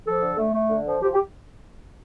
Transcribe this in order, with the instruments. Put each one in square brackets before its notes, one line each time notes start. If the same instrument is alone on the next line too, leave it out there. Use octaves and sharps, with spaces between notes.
[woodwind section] F3 A4
D3
A3
A3
D3
F3
F3 G4
G4